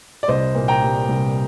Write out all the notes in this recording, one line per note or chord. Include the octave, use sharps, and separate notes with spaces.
D5
C2 C5 D#5
A#2
G5 A#5
G3
C2